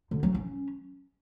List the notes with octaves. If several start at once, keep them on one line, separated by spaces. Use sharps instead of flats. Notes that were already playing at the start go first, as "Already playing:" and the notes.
D3
F#3
C#4